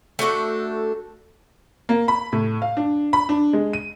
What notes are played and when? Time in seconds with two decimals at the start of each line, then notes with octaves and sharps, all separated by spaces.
0.19 A3 D4 F#4 A4
1.89 A#3
2.08 B5
2.33 A2
2.62 F5
2.77 D4
3.13 B5
3.29 D4
3.53 G#3
3.73 D#7